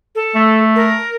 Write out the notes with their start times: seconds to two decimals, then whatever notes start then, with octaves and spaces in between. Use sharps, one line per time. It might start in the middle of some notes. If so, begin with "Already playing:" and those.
0.15 A4
0.35 A3
0.76 A#4